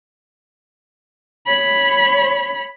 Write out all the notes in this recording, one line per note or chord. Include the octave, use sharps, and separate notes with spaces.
C#5 B5